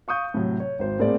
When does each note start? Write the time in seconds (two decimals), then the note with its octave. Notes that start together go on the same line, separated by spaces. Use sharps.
0.08 F5 C#6 D#6 G6
0.34 A2 C3 F#3
0.60 C#5
0.79 G#1 C5
0.99 A2 A#3 C4 G#4 D5